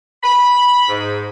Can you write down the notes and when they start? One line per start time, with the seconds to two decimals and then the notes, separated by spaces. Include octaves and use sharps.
0.24 B5
0.88 G#2